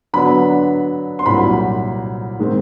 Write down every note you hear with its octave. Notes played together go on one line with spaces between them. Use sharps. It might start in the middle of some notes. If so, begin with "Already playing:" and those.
D3 F#3 B3 D4 B5
C6
C2 A#2 F#3 B5
D#3 G#3 C4